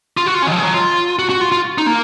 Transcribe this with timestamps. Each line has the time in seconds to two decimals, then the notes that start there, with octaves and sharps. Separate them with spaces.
0.17 F4
0.26 F#4
0.34 F4
0.42 C#4
0.47 D#3
0.51 F3
0.58 G#3
0.63 F#3
0.74 F4
1.19 F#4
1.29 F#4
1.41 F4
1.52 F4
1.78 D#4
1.86 A#3